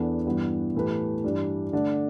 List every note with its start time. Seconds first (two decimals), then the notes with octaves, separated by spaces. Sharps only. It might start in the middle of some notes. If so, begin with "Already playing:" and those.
Already playing: E2 E3 B3 D4 A4
0.26 G2 E3 B3 G4
0.75 A2 E3 A3 G4 B4
1.24 G2 E3 G3 D4
1.72 D3 A3 D4